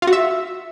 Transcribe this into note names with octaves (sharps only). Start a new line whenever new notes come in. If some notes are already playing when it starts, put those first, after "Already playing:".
F4
F#4
E5